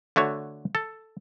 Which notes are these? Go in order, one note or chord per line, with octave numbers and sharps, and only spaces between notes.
D3 A3 F#4 C#5
A4